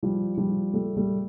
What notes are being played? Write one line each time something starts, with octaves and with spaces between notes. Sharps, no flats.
F3 G3
F3 G3
G3 A3
G3 A3